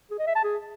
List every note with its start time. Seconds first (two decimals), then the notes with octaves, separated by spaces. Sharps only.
0.11 G#4
0.19 D#5
0.27 E5
0.35 A5
0.44 G#4